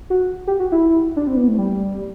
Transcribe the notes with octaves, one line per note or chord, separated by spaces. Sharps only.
F#4
G4
F#4
E4
D4
C4
B3
A3
G3